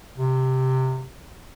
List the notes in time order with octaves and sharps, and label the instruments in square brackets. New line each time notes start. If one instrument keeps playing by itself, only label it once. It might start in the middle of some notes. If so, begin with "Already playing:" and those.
[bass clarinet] C3